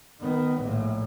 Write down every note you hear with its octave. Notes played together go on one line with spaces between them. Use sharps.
D#3 B3
A#1 A2